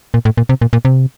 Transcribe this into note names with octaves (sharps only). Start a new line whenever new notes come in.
A#2
A2
A#2
C3
A#2
A#2
C3